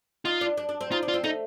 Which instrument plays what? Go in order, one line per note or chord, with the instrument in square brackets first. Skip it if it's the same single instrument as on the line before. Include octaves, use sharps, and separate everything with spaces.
[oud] D#4 [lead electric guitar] F4
[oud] D4
D4
D4
C4
[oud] D#4 [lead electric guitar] F4
[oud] D4
[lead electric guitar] F4
[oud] C4
[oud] A3 [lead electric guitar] D#4